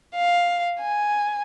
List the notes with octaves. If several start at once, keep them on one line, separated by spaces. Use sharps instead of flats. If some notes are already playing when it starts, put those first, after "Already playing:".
F5
G#5